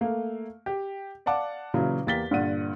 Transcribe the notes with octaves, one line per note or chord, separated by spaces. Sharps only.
A3 A#3 F5
G4
D5 F5 F#5 A5 D6
A#2 C#3 E3 F#3
E2 A#3 G4 A6 B6 G7
G2 A#2 D3 F#5 D#7